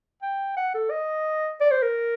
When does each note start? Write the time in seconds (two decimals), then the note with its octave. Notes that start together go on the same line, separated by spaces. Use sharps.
0.22 G5
0.56 F#5
0.74 A4
0.91 D#5
1.60 D5
1.71 C5
1.83 A#4